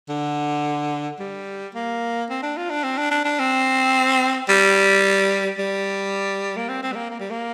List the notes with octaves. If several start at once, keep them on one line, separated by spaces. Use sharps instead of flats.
D3
G3
A#3
C4
D4
F4
D4
C4
D4
D4
D4
C4
G3
G3
A#3
C4
C4
G3
A#3
A#3
G3
A#3